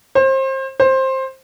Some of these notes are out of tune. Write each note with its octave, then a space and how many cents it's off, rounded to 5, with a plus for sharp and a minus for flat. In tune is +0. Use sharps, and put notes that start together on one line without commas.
C5 +30
C5 +15